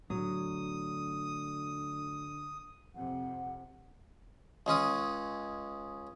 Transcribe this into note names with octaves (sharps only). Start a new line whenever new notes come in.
A2 D3 F#3 D#6
F2 C3 F#5
C#2 G#3 C#4 D#6